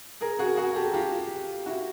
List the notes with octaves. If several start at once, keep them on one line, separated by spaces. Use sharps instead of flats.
G#4 A#4
F#4 G#4
F#4 G#4
G4 A4
F4 G4
E4 F#4